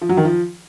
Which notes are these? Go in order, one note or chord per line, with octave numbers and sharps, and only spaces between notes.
F3
F#3
D#3
F3